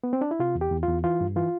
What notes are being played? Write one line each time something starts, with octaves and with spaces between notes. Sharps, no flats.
B3
C4
D4
E4
C3 F4
E2
G4
E2
F4
E2
E3 F4
G2
E3 F4